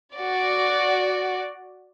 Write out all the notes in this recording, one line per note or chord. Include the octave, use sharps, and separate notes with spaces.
F#4 D5